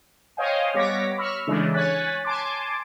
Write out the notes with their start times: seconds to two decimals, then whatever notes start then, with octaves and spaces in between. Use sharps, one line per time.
0.37 C5 C#5 D#5 F5 G5 G#5
0.74 G3 B3 C#5 D6 A#6 B6
1.18 B5 C#6 E6 F6
1.47 C#3 E3 G#3 A3 D4
1.74 C#5 G#5 F#6 A6 B6
2.25 G#5 A5 C6 D6